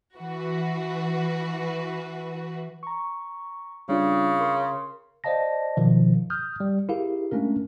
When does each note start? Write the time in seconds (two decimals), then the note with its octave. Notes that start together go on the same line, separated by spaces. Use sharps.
0.17 E3 F#4 B4
2.83 A#5 C#6
3.89 C#3 G3 D4 F4
4.41 A#4 C6
5.24 C5 D5 D#5 F5 A5 A#6
5.77 B2 D#3 F3
6.30 D#6 F6 G6
6.60 G3
6.89 E4 G4 G#4 A#4 F5
7.31 G#3 A3 C#4 D4 A#4